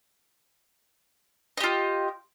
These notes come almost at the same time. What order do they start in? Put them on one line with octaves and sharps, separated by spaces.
D#5 G4 F4